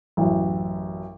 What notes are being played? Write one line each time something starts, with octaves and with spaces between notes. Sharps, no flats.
A1 F#2